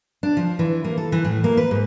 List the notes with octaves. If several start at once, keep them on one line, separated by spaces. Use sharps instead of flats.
D4
F3
E3
A#3
A4
E3
A2
A#3
B4
G#2